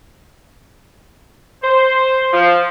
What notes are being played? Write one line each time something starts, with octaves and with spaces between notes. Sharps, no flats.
C5
F3